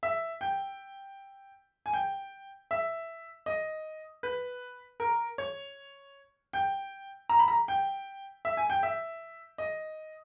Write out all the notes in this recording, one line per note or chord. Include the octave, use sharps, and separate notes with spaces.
E5
G5
G#5
G5
E5
D#5
B4
A#4
C#5
G5
A#5
B5
A#5
G5
E5
G#5
G5
E5
D#5